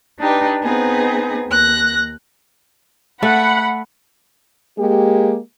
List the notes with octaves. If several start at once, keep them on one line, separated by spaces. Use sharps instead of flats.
D4 D#4 G4 B4
B3 C4 D#4 G#4 B4
D#2 F#6 A#6
A3 F#5 B5
G#3 A#3 G4